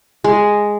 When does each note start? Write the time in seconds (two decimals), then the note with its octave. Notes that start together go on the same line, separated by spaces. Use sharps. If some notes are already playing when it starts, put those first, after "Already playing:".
0.24 G#3